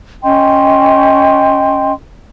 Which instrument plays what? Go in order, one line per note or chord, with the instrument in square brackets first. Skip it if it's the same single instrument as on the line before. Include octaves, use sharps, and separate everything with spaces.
[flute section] C#4 D#5 G5 C6